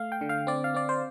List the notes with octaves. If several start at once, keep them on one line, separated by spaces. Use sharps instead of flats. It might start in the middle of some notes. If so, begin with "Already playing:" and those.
Already playing: A3 F5
G5
D3
F5
C4 D5
F5
C4 D5
C5